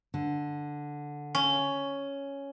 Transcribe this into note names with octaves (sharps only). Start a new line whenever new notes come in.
D3
C#4